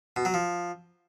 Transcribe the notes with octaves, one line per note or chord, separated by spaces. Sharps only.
B2
F#3
F3